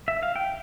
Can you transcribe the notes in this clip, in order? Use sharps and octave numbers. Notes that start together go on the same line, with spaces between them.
E5
F5
G5